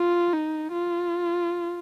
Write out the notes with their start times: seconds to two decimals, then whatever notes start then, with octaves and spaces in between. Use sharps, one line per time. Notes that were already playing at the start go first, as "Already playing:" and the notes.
Already playing: F4
0.33 D#4
0.73 F4